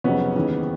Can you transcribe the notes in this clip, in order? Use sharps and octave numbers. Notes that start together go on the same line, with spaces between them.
F1 F2 C#3 F#3 B3 C#4
D#2 C#3 E3